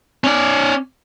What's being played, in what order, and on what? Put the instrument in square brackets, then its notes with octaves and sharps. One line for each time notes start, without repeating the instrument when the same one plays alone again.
[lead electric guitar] C#4 D5